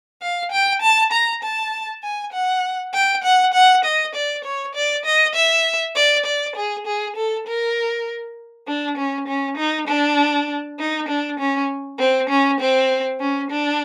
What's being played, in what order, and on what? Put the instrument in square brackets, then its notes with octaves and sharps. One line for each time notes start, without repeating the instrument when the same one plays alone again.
[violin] F5
G5
A5
A#5
A5
G#5
F#5
G5
F#5
F#5
D#5
D5
C#5
D5
D#5
E5
D5
D5
G#4
G#4
A4
A#4
D4
C#4
C#4
D#4
D4
D#4
D4
C#4
C4
C#4
C4
C#4
D4